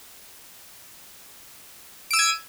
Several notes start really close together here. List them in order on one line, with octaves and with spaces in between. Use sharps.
D7 E6 D#7 G#6